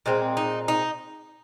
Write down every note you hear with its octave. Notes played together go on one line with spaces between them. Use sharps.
A#2 G#3 C4
D#4
D#4